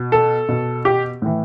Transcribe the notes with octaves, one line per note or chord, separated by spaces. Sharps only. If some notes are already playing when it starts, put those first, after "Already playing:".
Already playing: B2
A4
B2
G4
A2 E3